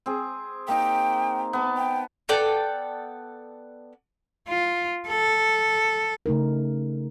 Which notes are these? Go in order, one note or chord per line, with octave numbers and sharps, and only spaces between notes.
C4 G#4
A#3 D#4 G5
B3 A5
G5
B3 A4 D5 G5
F4
A4
C#3 A3 D#4 A#4